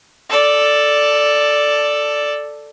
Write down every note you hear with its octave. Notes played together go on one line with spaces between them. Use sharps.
A4 D5